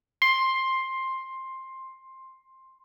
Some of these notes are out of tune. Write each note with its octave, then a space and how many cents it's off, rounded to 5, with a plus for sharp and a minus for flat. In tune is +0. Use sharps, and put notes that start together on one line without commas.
C6 +10